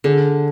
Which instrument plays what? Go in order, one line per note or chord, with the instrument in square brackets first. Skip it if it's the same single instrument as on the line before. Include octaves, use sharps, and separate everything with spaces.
[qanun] D3 [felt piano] G#4